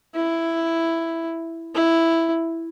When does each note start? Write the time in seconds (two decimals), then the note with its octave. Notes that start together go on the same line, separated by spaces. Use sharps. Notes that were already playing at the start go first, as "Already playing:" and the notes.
0.15 E4
1.75 E4